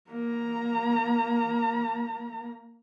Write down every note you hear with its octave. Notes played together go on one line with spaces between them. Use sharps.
A#3 A#5